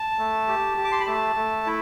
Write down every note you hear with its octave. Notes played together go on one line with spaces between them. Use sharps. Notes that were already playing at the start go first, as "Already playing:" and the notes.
Already playing: A5
A3
G4
G4
D6
C6
B5
A3 A5
A3
E4